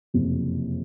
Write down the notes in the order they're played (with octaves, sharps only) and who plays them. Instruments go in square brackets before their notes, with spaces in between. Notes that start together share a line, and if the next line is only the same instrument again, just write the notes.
[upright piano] F#1 F2 C3